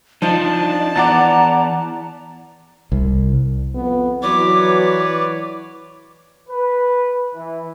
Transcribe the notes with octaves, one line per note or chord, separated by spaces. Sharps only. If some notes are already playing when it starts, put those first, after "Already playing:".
F3 D4 D#4 A5
E3 B3 D5 F#5 A#5 A6
C2
F2 B3
E3 F#3 B4 C#5 D5 D6
B4
E3